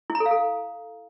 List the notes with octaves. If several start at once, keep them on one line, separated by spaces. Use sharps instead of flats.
E4
A#5
A4
F5
A4